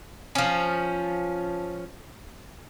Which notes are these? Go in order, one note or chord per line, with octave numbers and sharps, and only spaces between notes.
F3 C#4